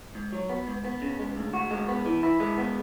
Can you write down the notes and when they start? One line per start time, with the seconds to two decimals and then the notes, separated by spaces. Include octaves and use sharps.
0.15 G#2
0.32 F#3
0.49 B3
0.67 G#2
0.85 B3
1.02 C#3
1.19 G#3
1.36 D2
1.54 F#4
1.71 G#3
1.88 B3
2.06 E3
2.23 E4
2.40 G#3
2.58 B3